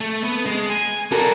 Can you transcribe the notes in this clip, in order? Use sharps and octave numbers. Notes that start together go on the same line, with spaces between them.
A3
B3
G#3
G#5
G3 F#4 A4 A#4